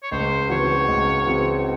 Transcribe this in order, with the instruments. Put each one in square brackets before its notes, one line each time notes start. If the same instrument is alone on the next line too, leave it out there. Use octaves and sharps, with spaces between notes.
[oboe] C#5
[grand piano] C#2 [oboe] C5
[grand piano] C#3 E3 C4 F#4 [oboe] C#5
[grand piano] C#2
C#3 E3 C4 F#4